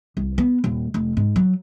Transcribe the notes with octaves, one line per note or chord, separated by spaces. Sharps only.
C2
B3
D#1
F1
G#2
F#3